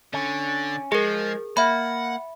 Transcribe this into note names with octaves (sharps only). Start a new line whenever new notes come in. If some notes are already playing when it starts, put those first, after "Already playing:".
D3 C#4
F3 G#3 G#4 A#4
A#3 E5 F#5 B5